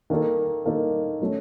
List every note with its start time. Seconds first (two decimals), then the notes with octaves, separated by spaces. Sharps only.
0.10 D#3 A#3 D#4 A4
0.66 D#3 A#3 D#4 A4
1.21 F#3 A3 C#4